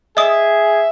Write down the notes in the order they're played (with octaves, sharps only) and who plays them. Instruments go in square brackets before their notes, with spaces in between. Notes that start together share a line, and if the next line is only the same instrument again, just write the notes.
[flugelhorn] G#4 [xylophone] D#5 D#6 [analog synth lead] E5